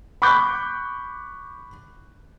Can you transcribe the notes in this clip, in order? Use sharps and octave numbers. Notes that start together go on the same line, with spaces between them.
B5 C#6 D6 F#6 G6